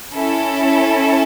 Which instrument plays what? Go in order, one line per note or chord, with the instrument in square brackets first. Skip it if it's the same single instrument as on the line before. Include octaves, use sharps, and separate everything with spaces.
[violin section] C#4 E4 A4